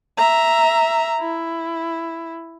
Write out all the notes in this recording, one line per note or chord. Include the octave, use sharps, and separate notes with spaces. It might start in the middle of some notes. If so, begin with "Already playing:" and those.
E5 A#5
E4